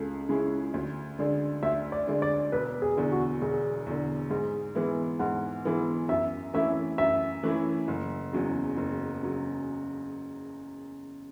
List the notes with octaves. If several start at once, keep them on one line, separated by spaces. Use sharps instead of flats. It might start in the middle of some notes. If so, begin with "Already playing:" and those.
Already playing: C#2 C#3 C#4 A4
C#3 G#3 C#4 E4
D2
D3 G#3 D4
D2 E5
D5
D3 G#3 D4
D5
E1 B4
G#4
E2 D3
F#4
E1 G#4
E2 D3
G#2 G#4
E3 G#3 B3 E4
G#2 F#5
E3 G#3 B3 E4
F#2 E5
E3 A3 C#4 E4 E5
F#2 E5
E3 A3 C#4 E4
F#1
E2 C#3 F#3
F#1
C#3 F#3